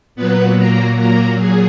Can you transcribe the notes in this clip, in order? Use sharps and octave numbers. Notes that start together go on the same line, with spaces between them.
A#2 F#3 B3 B4
A#3 A#4
A#3 A#4
G#4